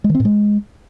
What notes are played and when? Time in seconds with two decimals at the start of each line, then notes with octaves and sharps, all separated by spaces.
0.04 G#3
0.09 D#3
0.15 C4
0.20 A2
0.25 G#3